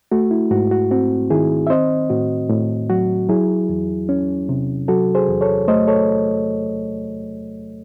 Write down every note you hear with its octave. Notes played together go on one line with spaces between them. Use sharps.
A3 F#4
E4
G#2 F#4
F#4
C4 F#4
D#3 E4 G#4
E5
C4 C5 D#5
A2 F#4
A2
F#3 F#4
F#3 E4 G#4
E2
C#4
C3
F#3 F#4 A4
G#4 C5
E2
A4 C#5
A3 C5 D#5
A4 C#5